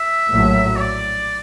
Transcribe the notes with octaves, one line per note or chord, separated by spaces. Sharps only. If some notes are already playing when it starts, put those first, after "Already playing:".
Already playing: E5
A#1 A2 F#3
C#5
D5